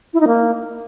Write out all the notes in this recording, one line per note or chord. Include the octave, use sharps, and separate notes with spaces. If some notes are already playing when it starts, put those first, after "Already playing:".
E4
D#4
A#3